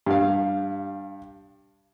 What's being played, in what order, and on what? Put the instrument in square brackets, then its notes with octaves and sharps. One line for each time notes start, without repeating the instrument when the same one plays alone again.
[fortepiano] G2 G3 F5